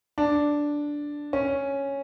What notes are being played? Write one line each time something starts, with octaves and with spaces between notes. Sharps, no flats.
D4
C#4